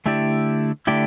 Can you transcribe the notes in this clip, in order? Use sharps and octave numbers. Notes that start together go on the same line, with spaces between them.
D3 A3 E4 G4 D5
D3 A3 E4 G4 D5